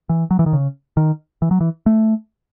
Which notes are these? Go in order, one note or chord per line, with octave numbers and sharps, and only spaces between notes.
E3
F#3
E3
D#3
C#3
D#3
E3
F#3
E3
A3